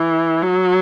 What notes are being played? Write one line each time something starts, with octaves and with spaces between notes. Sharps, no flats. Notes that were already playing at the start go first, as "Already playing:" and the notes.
Already playing: E3
F#3